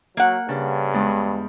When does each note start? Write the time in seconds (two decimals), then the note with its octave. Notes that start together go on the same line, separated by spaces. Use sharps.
0.17 F#3 A#3 F#5
0.49 G2 C#3 D4
0.93 E2 G#3 D4